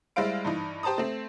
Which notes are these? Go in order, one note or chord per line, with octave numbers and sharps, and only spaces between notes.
G3 G#3 E4 C5 F5 D7
G2 E3 D#4
G4 C5 A5 A#5 D#6
A3 C4